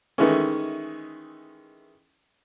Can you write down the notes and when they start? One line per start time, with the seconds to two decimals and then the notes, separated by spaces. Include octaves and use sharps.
0.18 D#3 E3 G#3 A3 C#4